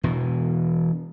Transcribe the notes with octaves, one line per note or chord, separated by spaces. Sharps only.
E1 B2 E3